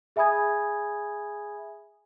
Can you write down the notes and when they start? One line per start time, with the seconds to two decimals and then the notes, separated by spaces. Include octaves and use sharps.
0.16 G#4 E5 G#5 B5 D#6 G#6